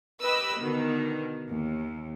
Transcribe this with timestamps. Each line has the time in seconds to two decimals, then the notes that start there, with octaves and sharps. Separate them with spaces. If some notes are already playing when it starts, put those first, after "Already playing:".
0.21 G4 B4 D#5 B5 E6
0.59 B2 D3 D#3
1.48 D#2